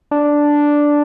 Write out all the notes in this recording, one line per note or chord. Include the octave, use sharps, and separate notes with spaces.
D4